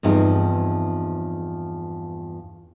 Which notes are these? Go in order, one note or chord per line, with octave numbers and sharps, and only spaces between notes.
E2 G2 F3 C4 D#4 G#4